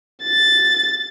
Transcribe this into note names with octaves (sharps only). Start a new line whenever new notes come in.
A6